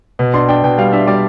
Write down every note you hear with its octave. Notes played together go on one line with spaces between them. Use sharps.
B2
D4 C6
D4 G5
B2 G5
G3 F5
D4 E5
G3 D5